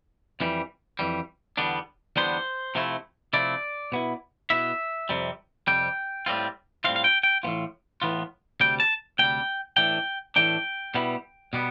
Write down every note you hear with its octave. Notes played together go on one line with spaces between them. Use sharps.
F2 E3 G3
F2 E3 G3
E2 D3 G3 B3 D4
E2 D3 G3 B3 D4 C5
C3 F3 A3 E4
C3 F3 A3 E4 D5
B2 B3 E4
B2 B3 E4 E5
F2 C3 G3
F2 C3 G3 G5
A2 G3 C4 F4
A2 G3 C4 F4 F5
F5
G5
G5
A2 E3 B3 F4
A2 E3 B3 F4
D2 C3 G3 G5
A5
D2 C3 G3 G5
A2 E3 A3 D4 G5
A2 E3 A3 D4 G5
B2 G3 B3 E4
B2 G3 B3